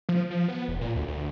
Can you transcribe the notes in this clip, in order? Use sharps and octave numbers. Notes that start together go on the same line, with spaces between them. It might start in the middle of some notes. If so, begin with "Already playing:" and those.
F3
F3
B3
E1
A#2
D2
D2